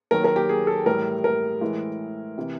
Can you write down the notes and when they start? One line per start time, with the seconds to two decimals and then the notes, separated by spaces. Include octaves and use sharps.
0.11 D#2 D#3 F#3 A#4
0.24 A#4
0.36 G4
0.49 G#4
0.67 A4
0.86 A2 E3 G3 A#4
1.24 A#4
1.61 A2 E3 G#3
2.38 C3 E3